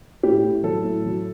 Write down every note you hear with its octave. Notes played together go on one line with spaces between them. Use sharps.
A2 G4
A2
F#3 A4
A2
F#3